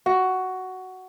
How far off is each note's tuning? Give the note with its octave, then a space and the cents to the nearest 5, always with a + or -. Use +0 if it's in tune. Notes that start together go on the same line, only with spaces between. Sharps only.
F#4 +10